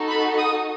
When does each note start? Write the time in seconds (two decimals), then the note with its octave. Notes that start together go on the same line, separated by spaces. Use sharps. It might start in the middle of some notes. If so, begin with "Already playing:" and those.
Already playing: D#4 F#4 A4
0.09 B5
0.39 D#6